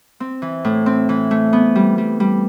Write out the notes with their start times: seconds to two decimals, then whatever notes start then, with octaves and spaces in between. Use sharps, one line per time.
0.20 C4
0.42 E3
0.65 A2
0.86 C4
1.09 E3
1.31 A3
1.53 B3
1.75 G3
1.98 G3
2.20 G3